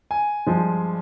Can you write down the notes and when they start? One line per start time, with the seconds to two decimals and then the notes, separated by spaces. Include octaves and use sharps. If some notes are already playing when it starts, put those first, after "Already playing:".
0.11 G#5
0.46 G2 F3 G#3